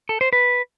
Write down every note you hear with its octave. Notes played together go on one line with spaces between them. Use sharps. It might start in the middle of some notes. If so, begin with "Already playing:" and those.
A4
C5
B4